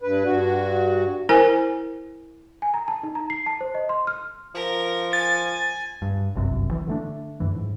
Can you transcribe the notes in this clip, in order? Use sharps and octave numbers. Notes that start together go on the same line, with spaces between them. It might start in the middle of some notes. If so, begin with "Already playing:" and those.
G2 B4
G2 F#4
E4 A#4 C5 G#5
G#5
A#5
A5
D#4
A#5
C7
A5
C5
D#5
C6
F6
F3 A#4
G#5 A6
G2
G1 C2 F#2 C3
E3
D3 A3 D4
F#2 E3
G#2